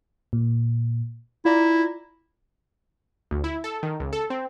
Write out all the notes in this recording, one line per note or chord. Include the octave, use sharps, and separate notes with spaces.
A#2
E4 F4 D5 A#5
D2
E4
A4
D#3
C#2
A4
C4